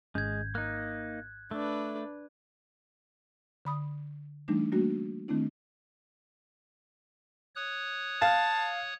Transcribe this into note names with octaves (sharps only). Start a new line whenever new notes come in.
G#1 G#3 C#4 G6 G#6
A#3 D#4 F#6
A3 D4 B4
D3 B5 D#6
E3 G3 A3 D4 D#4
G3 A3 A#3 D4 F#4
D#3 A3 C4 D4 E4
C#5 D#6 F#6
F5 A5